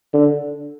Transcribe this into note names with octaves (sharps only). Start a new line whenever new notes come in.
D3